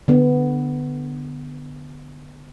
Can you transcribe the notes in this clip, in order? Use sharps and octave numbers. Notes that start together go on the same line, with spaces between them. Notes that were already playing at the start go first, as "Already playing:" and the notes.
D3 B3